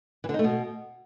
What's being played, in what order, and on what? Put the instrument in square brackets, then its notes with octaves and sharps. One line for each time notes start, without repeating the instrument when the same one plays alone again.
[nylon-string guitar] E3
D3
D#4
A3
B2